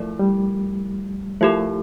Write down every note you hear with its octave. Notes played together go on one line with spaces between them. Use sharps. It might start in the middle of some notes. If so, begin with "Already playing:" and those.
Already playing: F3 A3 E4 A#4 D5
G3
F3 A3 E4 G4 A#4